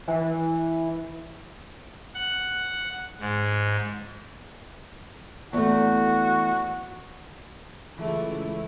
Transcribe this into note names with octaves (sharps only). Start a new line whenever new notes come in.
E3
F#5
G#2
E2 A3 F#4
C#2 E3 A3 E4